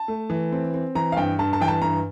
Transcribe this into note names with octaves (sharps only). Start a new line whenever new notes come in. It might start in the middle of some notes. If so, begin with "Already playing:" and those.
Already playing: A5
A3
E3
C4
C4
E3 A#5
F5
G2 G5
G2 A5
A5
E3 G5
A5
G2 A#5